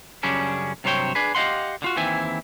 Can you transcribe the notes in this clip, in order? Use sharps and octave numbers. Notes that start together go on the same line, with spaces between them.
F#2 C#3 G3 C#4 D4
G2 C3 F#3 C5 C#5 G5
D4 G#4 B4
G4 D#5 F5 F#5 C6
D3 F4 F#4
D#2 D#3 E3 C4 E4 G#5